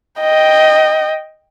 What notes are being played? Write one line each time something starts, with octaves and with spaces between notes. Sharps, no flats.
D#5 G5